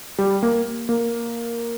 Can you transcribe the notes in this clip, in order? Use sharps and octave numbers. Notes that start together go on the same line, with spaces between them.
G3
A#3
A#3